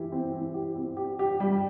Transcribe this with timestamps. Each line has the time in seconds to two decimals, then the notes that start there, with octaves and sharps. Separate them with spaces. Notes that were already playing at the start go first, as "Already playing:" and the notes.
Already playing: E3 G4
0.12 C4
0.33 E3
0.54 G4
0.76 C4
0.97 G4
1.19 G4
1.40 G3